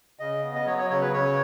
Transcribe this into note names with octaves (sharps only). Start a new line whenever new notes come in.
C#3 D#5
B3
D#5
F#3 C#5
C#5
C#3 C#5
B4
C#3 C#5